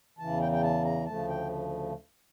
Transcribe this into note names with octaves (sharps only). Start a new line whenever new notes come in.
E2 C#3 E3 A5
G5
G5
A5
A#5
D2 C#3 F3 A3 A5
G5